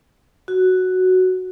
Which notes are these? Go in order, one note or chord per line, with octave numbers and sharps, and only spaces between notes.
F#4